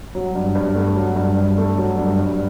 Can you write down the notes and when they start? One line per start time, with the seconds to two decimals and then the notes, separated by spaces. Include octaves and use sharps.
0.15 F#3
0.35 G2
0.55 G2
0.75 A3
0.96 F#3
1.16 G2
1.37 G2
1.57 A3
1.78 F#3
1.98 G2
2.19 G2